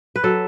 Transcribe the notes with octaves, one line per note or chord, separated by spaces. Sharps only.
B4
F#3 A4